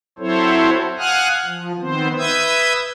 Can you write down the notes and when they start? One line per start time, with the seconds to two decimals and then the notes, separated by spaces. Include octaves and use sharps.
0.19 F#3 C4 E4 A4 C5 C#5
0.98 F5 F#5 G#5 D#6 F6 F#6
1.45 F3
1.79 D#3 B3 C4 C5
2.18 B4 E5 D#6 E6 G6 G#6